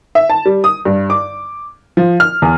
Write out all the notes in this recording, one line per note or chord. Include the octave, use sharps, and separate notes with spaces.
E5
A5
G3
D#6
G2
D6
F3
F6
E2